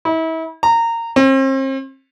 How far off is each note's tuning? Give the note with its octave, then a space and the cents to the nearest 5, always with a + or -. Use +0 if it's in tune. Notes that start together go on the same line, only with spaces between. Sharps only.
E4 -35
A#5 -20
C4 +40